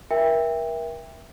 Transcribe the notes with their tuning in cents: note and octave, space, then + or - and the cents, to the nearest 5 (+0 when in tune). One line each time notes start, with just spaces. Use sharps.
A#4 +35 E5 +0 G5 +25